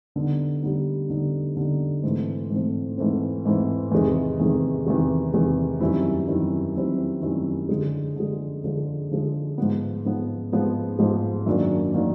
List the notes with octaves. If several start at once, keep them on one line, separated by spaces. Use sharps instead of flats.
D3 G3 B3 D#4
D3 G3 B3 D#4
D3 G3 B3 D#4
D3 G3 B3 D#4
G#2 E3 A3 C4
G#2 E3 A3 C4
G#2 E3 A3 C4
G#2 E3 A3 C4
E2 C3 D#3 G#3
E2 C3 D#3 G#3
E2 C3 D#3 G#3
E2 C3 D#3 G#3
F#2 D#3 G3 C4 E4
F#2 D#3 G3 C4 E4
F#2 D#3 G3 C4 E4
F#2 D#3 G3 C4 E4
D3 F3 G#3
D3 F3 G#3
D3 F3 G#3
D3 F3 G#3
G#2 F3 G#3 B3
G#2 F3 G#3 B3
G#2 F3 G#3 B3
G#2 F3 G#3 B3
F#2 D#3 F#3 A#3 D4
D#3 F#3 A#3 D4